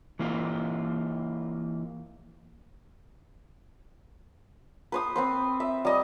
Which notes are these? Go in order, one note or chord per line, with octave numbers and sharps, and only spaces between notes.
E3 A#3 F4
B4 C5 D#6
C4 B4 C5
E5
G3 D#5